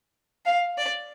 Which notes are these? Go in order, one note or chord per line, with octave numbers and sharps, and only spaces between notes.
F5
D5